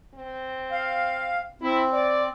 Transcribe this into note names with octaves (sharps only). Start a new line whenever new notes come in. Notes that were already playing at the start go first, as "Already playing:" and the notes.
C4
F5
C4 E4
D5